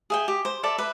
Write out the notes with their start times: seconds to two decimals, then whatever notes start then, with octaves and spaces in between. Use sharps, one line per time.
0.10 G#4 E5 G5
0.28 G4
0.45 C5
0.63 A4 D5 E5
0.78 B4 E5